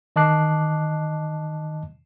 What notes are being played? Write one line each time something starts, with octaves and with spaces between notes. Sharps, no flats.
D#3 D#5 A5 D6 F#6 C7